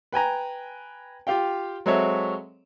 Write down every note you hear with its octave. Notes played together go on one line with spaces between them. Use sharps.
B4 G5 G#5 A#5
F4 G4 F5 G5
F#3 G#3 C4 A4 C#5 E5